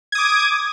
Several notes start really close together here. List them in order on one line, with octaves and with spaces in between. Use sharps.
G#6 D#6 D6